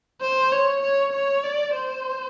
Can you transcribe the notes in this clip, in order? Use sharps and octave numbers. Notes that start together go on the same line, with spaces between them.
C5
C#5
C#5
C#5
D5
C5